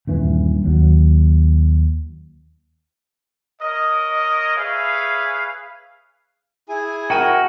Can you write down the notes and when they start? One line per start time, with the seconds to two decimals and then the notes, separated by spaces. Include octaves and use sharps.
0.07 D#1 G2 E3
0.64 D#2 F#3
3.61 A#4 C#5 D#5
4.56 G#4 B4 C#5 E5 F5
6.69 E4 G#4 G#5
7.10 F#4 A#4 G5 D#7